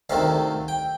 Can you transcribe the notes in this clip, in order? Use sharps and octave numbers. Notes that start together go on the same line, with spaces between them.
D2 C3 D#3 A3 F5
G5